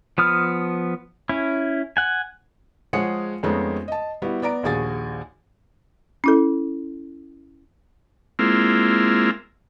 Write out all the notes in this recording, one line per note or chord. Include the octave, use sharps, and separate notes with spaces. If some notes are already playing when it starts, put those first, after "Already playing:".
F3 B3 D#6 F6
C#4 E4
F#5 G#5
F3 G#3 G#4 C#5 F#5 C#7
F2 G#3 A3 B3 C#4 D#4
D#5 A5
G3 B3 E4 F#4
B3 D5 A#5 D7
A#1 D#2 F#4 G#4 G#5 A6
C#4 E4 A4
G#3 A#3 C4 E4 F4